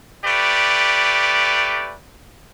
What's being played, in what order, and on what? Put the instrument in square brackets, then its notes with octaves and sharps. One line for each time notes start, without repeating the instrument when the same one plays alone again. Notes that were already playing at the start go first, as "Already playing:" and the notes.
[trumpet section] A3 G4 B4 D5